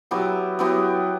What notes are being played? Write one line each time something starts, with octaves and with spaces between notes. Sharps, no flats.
F#3 B3 E4 G4
F#3 B3 E4 G4